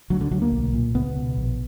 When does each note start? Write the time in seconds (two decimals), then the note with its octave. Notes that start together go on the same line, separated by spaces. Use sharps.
0.10 D2 F#3
0.21 D3
0.31 D2 F#3
0.42 A#3
0.52 B1
0.73 A#2
0.95 C#2 B3
1.16 B2
1.37 A#1